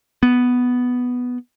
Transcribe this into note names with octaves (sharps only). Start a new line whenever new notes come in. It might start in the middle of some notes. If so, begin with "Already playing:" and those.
B3